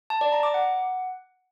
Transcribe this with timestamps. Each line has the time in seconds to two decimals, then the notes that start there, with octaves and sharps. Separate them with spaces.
0.10 A5
0.21 D5
0.32 A#5
0.43 D6
0.54 F#5